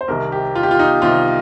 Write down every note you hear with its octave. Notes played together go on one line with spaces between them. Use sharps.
C5
C2 C3 D#3 A#4
G4
F4
G4
F4
D#4
C2 C3 D#3 F4